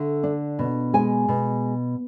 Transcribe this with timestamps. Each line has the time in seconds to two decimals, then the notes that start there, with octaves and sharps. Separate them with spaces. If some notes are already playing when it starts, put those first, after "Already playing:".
Already playing: D3 A3
0.23 D4
0.59 B2
0.93 G#3 G#5
1.28 B2